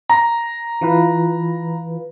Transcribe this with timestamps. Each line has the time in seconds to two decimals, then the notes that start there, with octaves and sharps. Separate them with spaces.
0.10 A#5
0.81 E3 F4 B4